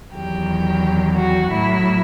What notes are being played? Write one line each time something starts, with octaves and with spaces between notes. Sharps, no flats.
E2 D#3 F#3 G4
F#4
A2 F#3 E4